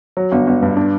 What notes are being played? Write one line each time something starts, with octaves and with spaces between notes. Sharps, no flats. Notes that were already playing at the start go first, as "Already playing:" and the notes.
F#3
G1
G1
G2
D4